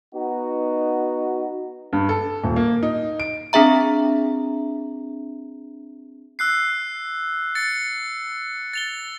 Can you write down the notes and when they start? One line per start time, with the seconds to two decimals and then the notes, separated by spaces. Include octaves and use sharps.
0.14 B3 D#4 F#4
1.93 G2
2.09 A4
2.44 D#1
2.56 A#3
2.83 D#4
3.20 D7
3.53 C4 D4 G#4 E5 A#5
6.39 E6 F#6 C7
7.55 A6 C#7
8.74 A6 F7 G7